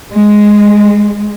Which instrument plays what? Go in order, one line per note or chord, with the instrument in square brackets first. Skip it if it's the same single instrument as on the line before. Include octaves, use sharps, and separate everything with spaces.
[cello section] G#3